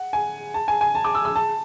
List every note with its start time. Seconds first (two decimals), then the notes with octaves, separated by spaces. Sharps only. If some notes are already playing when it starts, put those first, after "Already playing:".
Already playing: F#5
0.13 G#5
0.54 A5
0.68 G#5
0.81 G#5
0.95 A5
1.04 D6
1.15 E6
1.25 E6
1.36 A5